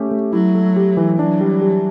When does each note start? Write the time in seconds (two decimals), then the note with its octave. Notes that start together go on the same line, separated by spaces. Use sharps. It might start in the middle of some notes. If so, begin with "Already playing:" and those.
Already playing: A3 C#4 G4
0.11 A3
0.33 F#3 E4
0.55 A3
0.76 G4
0.97 E3
1.19 F#3 D4
1.41 G3
1.62 G4